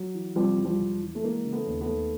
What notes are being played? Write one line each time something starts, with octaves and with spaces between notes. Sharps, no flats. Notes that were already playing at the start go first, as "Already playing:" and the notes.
Already playing: F#3
E3
C3 F3 G3
E2
F3 G3
E1
E3
A3
E3 G#3 A#3
C#3
A3 B3
D#2
A3 B3
D#2